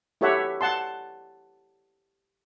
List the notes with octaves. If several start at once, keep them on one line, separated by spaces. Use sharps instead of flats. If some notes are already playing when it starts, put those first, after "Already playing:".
E4 G4 A4 C#5 E5 F#5
F#5 A5 C6